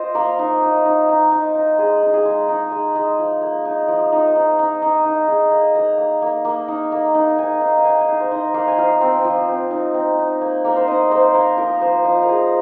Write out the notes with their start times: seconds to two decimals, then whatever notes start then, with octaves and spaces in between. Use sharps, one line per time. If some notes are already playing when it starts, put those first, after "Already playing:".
Already playing: F4 C5 D#5
0.15 A#3 A#4
0.39 D#4
0.62 D#4
0.85 D#4
1.09 D#4
1.31 D#4
1.55 D#4
1.78 G#3 G#4
2.02 D#4
2.13 G#4
2.25 G#3
2.49 D#4
2.72 G#3
2.96 G#3
3.19 F3
3.42 A#3
3.65 D#4
3.88 F3
4.12 D#4
4.35 D#4
4.59 D#4
4.82 D#4
5.05 D#4
5.28 D#4 G#4
5.51 A#3
5.75 A#3 A#5
5.98 A#3
6.22 A#3
6.45 A#3
6.68 D#4
6.92 A#3
7.15 D#4
7.38 D#4 G#5
7.61 D#4 F5
7.77 F5
7.85 A#3 G#5
8.01 G#5
8.08 D#4 F5
8.20 C5
8.31 D#4 D#5
8.54 A#3 F5
8.68 G#5
8.77 F3 F5
9.01 C4
9.25 F3
9.48 C4
9.71 D#4
9.94 C4
10.18 D#4
10.41 A#3
10.65 A#3 A#4
10.76 C5
10.88 D#4 D#5
11.11 A#3 C5
11.34 A#3 A#4
11.57 F3 A#4
11.81 F3 C5
12.04 F3 D#5
12.23 A#4
12.28 F3 G#4